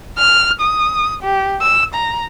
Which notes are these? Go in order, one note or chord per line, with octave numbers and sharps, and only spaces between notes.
F6
D#6
G4
E6
A#5